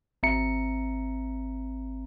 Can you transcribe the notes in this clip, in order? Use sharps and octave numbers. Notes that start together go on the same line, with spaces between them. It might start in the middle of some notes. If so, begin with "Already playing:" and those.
G#1 C4 E5 A#5 C#7